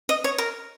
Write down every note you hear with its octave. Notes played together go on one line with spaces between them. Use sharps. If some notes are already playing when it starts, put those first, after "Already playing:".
D#5
C#5
A#4